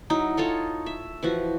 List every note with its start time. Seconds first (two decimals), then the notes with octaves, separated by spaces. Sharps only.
0.10 F#3 D#4 E4
0.37 D#4 F4 A4 C#5
0.86 E5
1.23 E3 F3 F#4